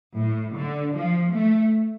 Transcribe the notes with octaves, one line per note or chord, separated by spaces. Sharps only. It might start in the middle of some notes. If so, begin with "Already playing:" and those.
A2
D3
F3
A3